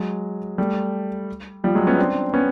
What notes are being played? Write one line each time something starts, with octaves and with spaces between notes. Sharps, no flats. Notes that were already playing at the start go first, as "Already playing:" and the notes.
Already playing: F#3 G#3
G3 A3
F3 G3
F#3 G#3
B3 C#4
C4 D4
B3 C#4